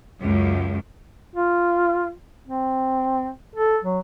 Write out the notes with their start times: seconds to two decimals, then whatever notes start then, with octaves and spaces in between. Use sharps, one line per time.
0.20 C#2 F#2
1.35 F4
2.47 C4
3.56 A4
3.84 F#3